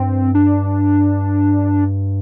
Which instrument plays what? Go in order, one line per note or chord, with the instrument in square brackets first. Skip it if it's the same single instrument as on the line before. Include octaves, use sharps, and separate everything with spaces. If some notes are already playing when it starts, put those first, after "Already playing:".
Already playing: [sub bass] G2 [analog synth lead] C4
[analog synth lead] D4